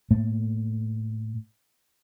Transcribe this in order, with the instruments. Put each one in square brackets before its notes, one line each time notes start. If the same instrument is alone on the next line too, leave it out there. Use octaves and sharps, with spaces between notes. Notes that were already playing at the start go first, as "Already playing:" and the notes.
[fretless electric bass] A2 A3 A#3